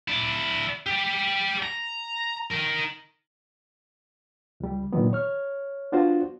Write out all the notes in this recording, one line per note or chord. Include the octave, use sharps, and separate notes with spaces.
E4 D5
G4 D5
A#5
D#3 A#4
C#2 G3
A#2 D3 D#3 F#3 B3
C#5 F6
B3 D4 F4 F#4 C5